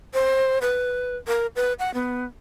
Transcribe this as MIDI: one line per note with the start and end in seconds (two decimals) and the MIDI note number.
0.14 0.59 72
0.62 1.17 71
1.27 1.46 70
1.56 1.73 71
1.79 1.93 78
1.94 2.25 59